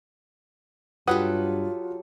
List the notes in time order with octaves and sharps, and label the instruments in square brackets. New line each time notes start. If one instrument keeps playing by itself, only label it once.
[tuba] G2 [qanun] F#3 G4 A4 [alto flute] F4 [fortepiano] B4 F#5 D#6